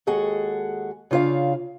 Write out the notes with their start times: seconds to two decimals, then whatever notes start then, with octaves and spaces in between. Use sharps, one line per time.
0.07 D#2 G#3 F#4 G#4 A4 F#5
1.11 C#3 D4 F4 C#5 F5